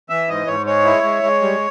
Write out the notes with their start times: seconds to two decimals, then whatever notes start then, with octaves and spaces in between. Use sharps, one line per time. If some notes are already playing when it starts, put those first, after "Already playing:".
0.10 E3 E5
0.29 G#2 D#5
0.47 G#2 C#5
0.66 G#3 C#5
0.85 E4
1.03 G#3
1.23 G#3
1.42 G3